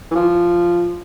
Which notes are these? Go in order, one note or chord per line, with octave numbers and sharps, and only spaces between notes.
E3
F3